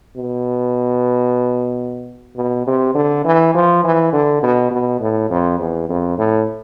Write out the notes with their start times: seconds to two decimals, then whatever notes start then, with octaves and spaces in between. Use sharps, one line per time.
0.16 B2
2.36 B2
2.67 C3
2.95 D3
3.25 E3
3.54 F3
3.84 E3
4.13 D3
4.43 B2
4.71 B2
5.00 A2
5.30 F2
5.60 E2
5.89 F2
6.18 A2